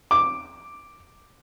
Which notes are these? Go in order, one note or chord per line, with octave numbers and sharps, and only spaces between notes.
D6